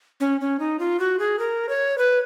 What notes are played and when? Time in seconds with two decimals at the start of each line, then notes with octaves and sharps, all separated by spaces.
0.20 C#4
0.41 C#4
0.59 D#4
0.79 F4
1.00 F#4
1.19 G#4
1.39 A#4
1.69 C#5
1.98 B4